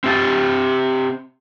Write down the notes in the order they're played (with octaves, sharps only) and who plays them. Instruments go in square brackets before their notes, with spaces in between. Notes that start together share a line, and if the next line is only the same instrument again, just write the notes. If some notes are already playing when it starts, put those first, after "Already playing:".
[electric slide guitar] C4 G4 A5